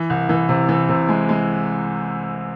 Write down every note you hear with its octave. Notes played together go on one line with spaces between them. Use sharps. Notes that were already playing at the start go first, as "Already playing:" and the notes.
Already playing: E3
C2
E3
C3
E3
C3
G#3
G#3